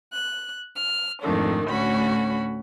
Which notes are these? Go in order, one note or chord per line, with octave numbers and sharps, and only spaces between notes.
F#6
F6
F2 G#2 D#3 A3 D4
D2 A2 C#4 F#4 B5